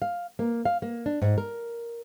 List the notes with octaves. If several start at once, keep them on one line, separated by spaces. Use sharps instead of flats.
F5
A#3
F5
A#3
D4
G#2
A#4